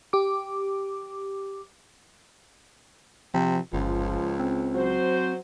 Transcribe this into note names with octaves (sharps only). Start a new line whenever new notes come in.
G4 D6
C3 F3
G1 C#2 F3
C4
F#3 F#4 C5